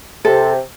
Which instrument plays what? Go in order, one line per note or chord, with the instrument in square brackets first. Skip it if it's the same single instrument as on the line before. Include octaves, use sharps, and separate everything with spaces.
[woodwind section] C3 [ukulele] A4